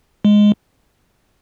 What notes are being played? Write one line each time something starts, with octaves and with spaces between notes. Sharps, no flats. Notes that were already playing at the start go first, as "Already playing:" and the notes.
G#3